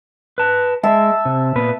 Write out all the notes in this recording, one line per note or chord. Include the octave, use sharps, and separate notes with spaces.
B4 A5
G#3 E5 A5
C3
A#2 B3 B4